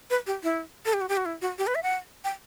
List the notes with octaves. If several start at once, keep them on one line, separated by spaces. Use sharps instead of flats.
B4
G4
E4
A4
G4
F#4
G4
F#4
E4
F#4
G4
B4
E5
F#5
G5